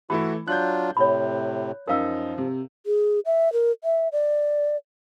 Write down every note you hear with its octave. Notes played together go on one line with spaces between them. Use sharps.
E3 A3 E4 F#4 B5
F#3 D4 F4 F#6 G6
A2 C3 C#5 B5
F#2 F3 D#4 A#4 F5 E6
C3
G#4
E5
A#4
E5
D5